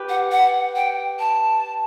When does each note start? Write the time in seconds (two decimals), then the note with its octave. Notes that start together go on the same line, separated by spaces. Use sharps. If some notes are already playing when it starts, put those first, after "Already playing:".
Already playing: G4 B4
0.09 F#5
0.32 F#5
0.76 G5
1.19 A5